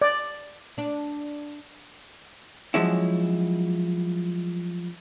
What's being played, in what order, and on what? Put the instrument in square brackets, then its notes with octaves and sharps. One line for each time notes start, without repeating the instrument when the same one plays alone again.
[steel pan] D5
[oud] D4
[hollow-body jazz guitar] F3 F#3 G#3 C#4 E4